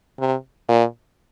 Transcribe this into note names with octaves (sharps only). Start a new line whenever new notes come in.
C3
A#2